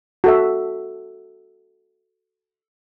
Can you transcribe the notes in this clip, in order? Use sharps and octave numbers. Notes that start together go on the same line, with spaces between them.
F#4 A4 E5